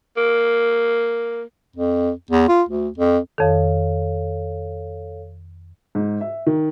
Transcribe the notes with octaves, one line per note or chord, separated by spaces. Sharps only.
A#3
F2
E2
F4
D2
F2
F2 D#3 A4 C#5 F5
G#2
E5
D#3